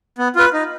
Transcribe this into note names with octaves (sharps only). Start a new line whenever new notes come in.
B3
F4 B4
D#4